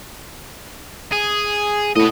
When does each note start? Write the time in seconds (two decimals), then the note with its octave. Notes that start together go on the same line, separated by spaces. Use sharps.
1.12 G#4
1.96 A2 B3 D#5